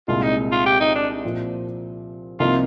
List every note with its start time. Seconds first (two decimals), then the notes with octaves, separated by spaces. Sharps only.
0.08 C2 A#2 G#3 F4
0.22 D#4
0.52 F4
0.66 G4
0.80 D#4
0.95 D4
1.24 A#2 F3 C4
2.40 C2 C3 F3 A#3 D#4 F4